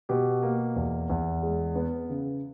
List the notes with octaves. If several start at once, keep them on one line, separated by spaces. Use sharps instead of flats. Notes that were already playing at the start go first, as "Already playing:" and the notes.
B2 G4
A#3
E2
E2
G#3
B3
C#3